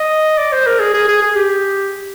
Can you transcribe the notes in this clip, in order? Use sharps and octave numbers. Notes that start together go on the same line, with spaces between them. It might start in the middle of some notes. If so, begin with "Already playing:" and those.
Already playing: D#5
D5
C5
A#4
G#4
G#4
G#4
G#4
G4